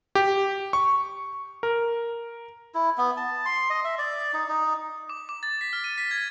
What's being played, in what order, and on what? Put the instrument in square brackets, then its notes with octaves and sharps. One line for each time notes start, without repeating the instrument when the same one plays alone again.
[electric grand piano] G4
C#6
A#4
[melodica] E4
B3
A5
C6
D#5
E5
D5
D#4
D#4
[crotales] D6
D6
A6
B6
F6
D#7
B6
G#6